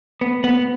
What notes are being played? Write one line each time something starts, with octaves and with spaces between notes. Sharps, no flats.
B3
B3